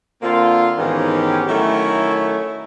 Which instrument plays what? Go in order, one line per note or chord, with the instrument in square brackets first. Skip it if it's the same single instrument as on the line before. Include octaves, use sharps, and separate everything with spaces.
[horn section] D3 A#3 C4 F4
G#2 D#3 E3 B3 C#4 G4
D#3 F#3 A3 C#4 E4